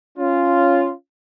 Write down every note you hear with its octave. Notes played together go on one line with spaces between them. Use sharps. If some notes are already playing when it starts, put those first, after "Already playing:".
C#4 F4